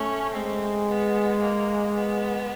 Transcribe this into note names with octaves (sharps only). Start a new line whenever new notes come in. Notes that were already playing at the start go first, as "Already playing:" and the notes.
Already playing: A3 C#4
G#3 C4
B3
A#3
B3